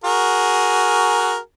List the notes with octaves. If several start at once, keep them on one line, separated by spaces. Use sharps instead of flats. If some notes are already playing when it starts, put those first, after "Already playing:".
F#4 G#4 A#4